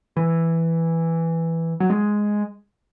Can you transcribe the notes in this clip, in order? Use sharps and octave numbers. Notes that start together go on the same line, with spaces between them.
E3
F#3
G#3